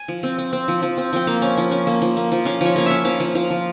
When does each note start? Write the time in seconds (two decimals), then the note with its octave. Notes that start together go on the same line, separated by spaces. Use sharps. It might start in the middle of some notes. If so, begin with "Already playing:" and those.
Already playing: G#5
0.08 F3
0.23 C4
0.38 C4
0.53 C4
0.68 F3
0.83 F3
0.98 C4
1.13 F3 G5
1.27 A#3 F5
1.42 C#4
1.57 F3
1.71 C#4
1.87 A#3
2.02 F3
2.17 A#3
2.32 F3
2.45 C#4 F5
2.61 F3 C#5
2.76 A#3 F5
2.86 C#4 E5
3.05 F3 F5
3.20 F3
3.35 F3 F5
3.50 F3